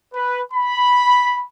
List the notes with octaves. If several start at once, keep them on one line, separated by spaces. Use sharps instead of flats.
B4
B5